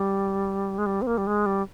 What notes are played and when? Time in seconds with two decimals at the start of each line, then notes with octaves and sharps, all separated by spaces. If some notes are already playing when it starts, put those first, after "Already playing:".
Already playing: G3
0.78 G#3
0.86 G3
1.02 C4
1.07 A#3
1.18 G3
1.27 G#3
1.46 G3